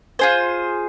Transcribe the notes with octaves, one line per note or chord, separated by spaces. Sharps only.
F4 G#4 C5